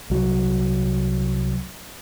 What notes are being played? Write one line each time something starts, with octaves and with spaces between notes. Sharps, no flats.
C2 F#3